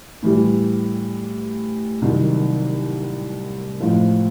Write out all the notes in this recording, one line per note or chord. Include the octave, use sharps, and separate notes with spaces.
A2 E3 G3
C2 C3 D#3 F#3
A1 A2 F3 G#3